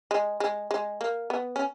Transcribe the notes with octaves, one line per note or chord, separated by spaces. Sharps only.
G#3
G#3
G#3
A#3
B3
C#4